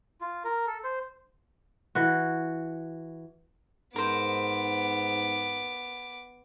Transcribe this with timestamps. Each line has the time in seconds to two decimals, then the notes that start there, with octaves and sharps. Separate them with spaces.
0.21 F4
0.44 A#4
0.67 A4
0.84 C5
1.95 E3 F#4
3.96 G#2 B3 A#4 C5 D6